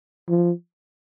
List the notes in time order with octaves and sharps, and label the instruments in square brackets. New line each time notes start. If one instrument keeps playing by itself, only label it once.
[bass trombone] F3